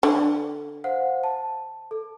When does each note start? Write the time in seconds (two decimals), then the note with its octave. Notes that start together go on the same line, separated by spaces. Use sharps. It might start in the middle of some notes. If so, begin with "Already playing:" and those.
0.03 D3
0.84 C5 F5 F#5
1.24 A5
1.91 A4